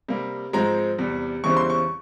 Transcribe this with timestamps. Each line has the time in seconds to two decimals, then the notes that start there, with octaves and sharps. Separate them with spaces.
0.08 C3 G3 A#3
0.53 G#2 F3 G#3 C4 A#5
0.98 E2 C3 G3
1.44 E2 C#3 E3 G3 C4 C#6
1.57 C6
1.70 C#6